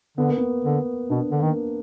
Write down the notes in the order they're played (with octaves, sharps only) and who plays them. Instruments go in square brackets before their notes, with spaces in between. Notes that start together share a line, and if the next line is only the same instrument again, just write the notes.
[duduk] D3 [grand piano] B3
[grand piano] A#3
B3
[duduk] D3
[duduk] B2 [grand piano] D4
[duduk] D3
[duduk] D#3 [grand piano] A#3